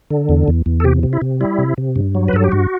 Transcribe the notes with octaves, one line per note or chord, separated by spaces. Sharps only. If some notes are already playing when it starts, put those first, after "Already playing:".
D3
E2
E2
E2
A4
C3 G4
C3
E4
C3
G3 E4
C3
C3
G2
F#3
B4
G2 A4
G4
G2 F#4